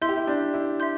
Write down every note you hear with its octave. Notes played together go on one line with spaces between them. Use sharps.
E4 E5 C6 G6
G4
E4
D4
E4
E5 C6 G6